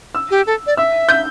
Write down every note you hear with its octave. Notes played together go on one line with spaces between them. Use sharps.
E6
G4
A4
D5
E5 E6
G6